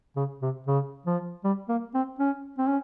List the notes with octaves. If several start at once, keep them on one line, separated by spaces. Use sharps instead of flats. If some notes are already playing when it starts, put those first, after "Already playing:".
C#3
C3
C#3
F3
G3
A#3
C4
C#4
C4
C#4